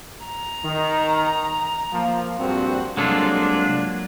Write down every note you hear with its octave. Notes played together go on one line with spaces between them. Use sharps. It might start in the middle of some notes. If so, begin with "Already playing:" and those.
A#5
D#3
F3 A#3
A#1 G2 C4 F#4
C2 F#3 G#3 A#3 D4 F4 A4